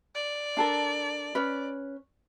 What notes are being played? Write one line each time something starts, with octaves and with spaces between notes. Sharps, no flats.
D5
D4 A4 A#4
C#4 B4